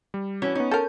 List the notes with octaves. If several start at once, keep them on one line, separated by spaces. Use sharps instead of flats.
G3
E3 C#4 F#4
B3 C#4 D#4
A4 A#4 G6